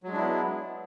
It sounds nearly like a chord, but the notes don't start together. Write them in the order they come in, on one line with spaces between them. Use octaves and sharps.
F#3 G#3 D4 E4 B3